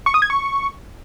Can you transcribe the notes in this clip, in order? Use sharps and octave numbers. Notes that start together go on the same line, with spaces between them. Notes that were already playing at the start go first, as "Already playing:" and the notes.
C#6
D#6
G#6
C#6